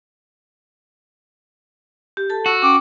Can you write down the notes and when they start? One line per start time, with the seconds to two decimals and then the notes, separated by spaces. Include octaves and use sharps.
2.17 G4
2.30 A4 A5
2.46 F#4 E6
2.62 C#4 G5 D6